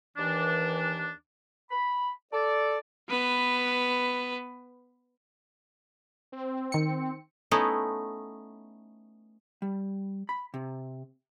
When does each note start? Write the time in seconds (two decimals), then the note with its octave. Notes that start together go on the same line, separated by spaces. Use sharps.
0.17 D#2 E3 D4
1.70 B5
2.33 A4 D5
3.09 B3 B4
6.32 C4
6.72 D#3 C#7
7.51 A3 B3 C#4 D#4 E4
9.62 G3
10.29 B5
10.54 C3